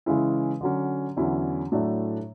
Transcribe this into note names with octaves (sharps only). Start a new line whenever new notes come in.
C#3 E3 G#3 C#4 E4
D3 F#3 C#4
E2 D3 F#3 C#4 E4
A2 F#3 A3 D4